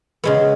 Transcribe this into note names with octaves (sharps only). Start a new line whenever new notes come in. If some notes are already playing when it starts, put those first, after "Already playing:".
C#3 G#3 B3